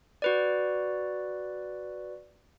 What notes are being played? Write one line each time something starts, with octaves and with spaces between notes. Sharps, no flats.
F#4 B4 D5